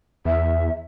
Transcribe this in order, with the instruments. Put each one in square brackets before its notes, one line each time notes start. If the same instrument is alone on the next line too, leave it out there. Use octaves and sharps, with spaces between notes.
[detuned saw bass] E2 [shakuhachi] E5